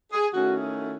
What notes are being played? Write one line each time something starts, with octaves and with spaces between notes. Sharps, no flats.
G#4
D#3 A3 C#4 E4 F#4